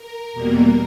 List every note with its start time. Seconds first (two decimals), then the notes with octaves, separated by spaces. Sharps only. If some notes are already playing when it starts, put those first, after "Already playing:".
Already playing: A#4
0.33 E2 B2 G3 A#3